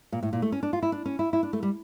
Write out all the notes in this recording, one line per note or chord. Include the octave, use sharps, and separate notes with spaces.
A#2
A2
A#2
A3
C#4
D4
F4
E4
D4
C#4
E4
E4
D4
A3
G3